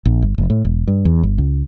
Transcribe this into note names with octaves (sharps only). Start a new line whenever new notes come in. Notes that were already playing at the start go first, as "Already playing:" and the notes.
A#1
G1
F1
A2
E1
G2
E2
G1
C#2